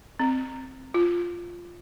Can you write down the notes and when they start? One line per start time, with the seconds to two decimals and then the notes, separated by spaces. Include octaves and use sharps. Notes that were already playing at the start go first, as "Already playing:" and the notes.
0.19 C4
0.94 F4